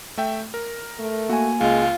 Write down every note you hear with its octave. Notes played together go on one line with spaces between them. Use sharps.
A3 E5 G5
A#4
A3
A#3 F#4 G#5
C#2 G#3 F4